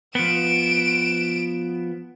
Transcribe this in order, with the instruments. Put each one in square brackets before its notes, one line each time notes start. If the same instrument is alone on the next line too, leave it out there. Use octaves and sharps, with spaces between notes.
[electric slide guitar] F3 B3 [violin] D7 E7